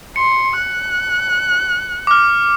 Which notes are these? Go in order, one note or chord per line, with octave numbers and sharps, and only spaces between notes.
C6 C#7
F#6
D6 F6